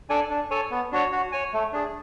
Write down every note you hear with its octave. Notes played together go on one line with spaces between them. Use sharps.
D4 A4 D5 G#5
D4
A4 C#5 G#5
B3
D4 F#4 C#5
F#4
C#5 G#5
A3
D4 G#4